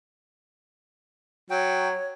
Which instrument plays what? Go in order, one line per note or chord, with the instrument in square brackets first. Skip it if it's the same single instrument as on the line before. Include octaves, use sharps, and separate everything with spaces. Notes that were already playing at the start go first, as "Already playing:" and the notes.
[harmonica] F#3 [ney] C#5 [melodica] G5